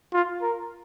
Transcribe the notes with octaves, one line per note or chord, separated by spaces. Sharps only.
F4
A#4